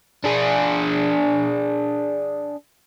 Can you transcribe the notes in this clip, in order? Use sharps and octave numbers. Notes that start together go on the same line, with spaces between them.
D4 G#4